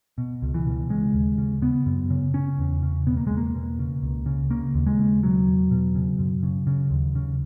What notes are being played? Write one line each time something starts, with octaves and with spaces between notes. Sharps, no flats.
B2
C#2
E3
B2
C#3 G#3
D#2
C#3
C#3 B3
F#2
C#3
C#3 C#4
E2
C#3
B2 B3
A#3
E2 G#3
A#3
B2
C#3
C#2
C#3
C#3 A#3
D#2
G#3
C#3
B2 F#3
E2
B2
C#3
F#2
C#3
C#3
D#2
C#3